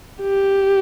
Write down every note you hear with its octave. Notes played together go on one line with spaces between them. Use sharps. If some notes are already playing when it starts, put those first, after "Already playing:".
G4